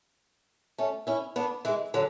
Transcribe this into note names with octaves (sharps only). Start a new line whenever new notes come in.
A3 C#4
C#4 E4
B3 D4
E3 G#3
D3 F#3